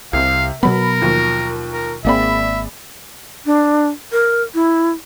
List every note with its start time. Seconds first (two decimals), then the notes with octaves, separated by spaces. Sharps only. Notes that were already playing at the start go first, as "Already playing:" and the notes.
0.13 C2 C3 F5
0.63 B2 F#3 B3 A#4 B5
1.02 D#2 F3
1.72 A#4
2.05 G#1 A#3 C4 G#4 D5 E5 B5
3.46 D4
4.12 A#4
4.54 E4